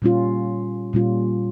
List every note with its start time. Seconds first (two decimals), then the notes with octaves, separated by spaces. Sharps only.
0.02 A#2 G3 C#4 F4
0.93 A#2 G3 C#4 F4